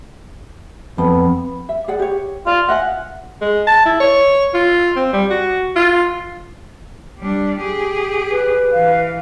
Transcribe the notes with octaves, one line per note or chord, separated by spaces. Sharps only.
F2 B3 C4 B5
E5
G#4 D5 F#5
G4 C#5
F4 D5
D#5 E5 F#5 G#5
G#3
A5
E4
C#5
F4
C4
G3
F#4
F4
G3 D4
G4 G#4
B4
E3 F5